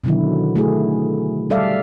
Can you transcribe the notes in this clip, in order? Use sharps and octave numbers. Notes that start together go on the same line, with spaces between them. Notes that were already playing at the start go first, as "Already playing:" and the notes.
B2 D3 D#3 F#3 E4
A3 E4 G#4
G3 A4 D5 E5 F5